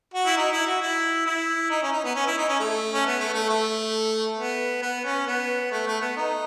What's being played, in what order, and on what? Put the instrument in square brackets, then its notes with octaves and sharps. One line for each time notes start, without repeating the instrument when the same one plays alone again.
[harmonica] F#4
E4
D#4
E4
F#4
E4
E4
D#4
C#4
D#4
B3
C#4
E4
D#4
C#4
A3
C#4
B3
A3
A3
A3
B3
B3
C#4
B3
A3
A3
B3
D#4